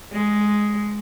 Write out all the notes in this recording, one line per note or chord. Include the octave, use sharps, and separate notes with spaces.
G#3